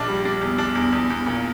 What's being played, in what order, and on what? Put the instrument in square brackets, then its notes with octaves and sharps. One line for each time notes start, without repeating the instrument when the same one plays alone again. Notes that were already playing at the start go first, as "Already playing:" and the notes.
Already playing: [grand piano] A#1 D4
G3
D4
E2
D4
E2
E2
E2
A#2